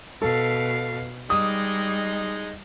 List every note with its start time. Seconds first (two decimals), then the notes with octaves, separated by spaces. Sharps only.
0.22 B2 A4 F5
1.30 G3 G#3 D#4 D#6